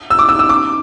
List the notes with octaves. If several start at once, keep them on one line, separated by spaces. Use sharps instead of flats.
E6
D6
E6
E6
D6